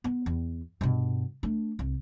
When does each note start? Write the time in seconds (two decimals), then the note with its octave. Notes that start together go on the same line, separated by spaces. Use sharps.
0.04 B3
0.26 E2
0.81 G2 B2
1.43 A3 D4
1.79 C2